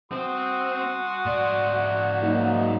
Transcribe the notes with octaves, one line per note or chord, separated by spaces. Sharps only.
C4 F#4 C6 D#6
G#2 D5
F#3 A#3 D#4